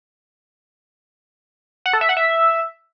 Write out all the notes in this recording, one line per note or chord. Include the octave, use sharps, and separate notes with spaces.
F#5
A4
E5
F#5
E5